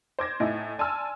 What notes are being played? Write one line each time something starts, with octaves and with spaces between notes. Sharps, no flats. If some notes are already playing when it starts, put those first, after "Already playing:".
C5 D6 G#6 A#6
A2 D#4 E4 G#5
D5 G#5 A5 C6 E6 F6